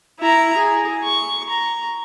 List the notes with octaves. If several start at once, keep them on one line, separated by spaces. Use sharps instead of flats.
E4 A#5
G#4
C#6
A#5